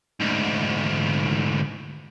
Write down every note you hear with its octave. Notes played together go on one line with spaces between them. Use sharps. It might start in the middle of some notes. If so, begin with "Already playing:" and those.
D2 G#2